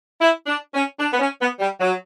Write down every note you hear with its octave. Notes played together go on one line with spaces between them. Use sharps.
E4
D4
C#4
D4
B3
C#4
B3
G3
F#3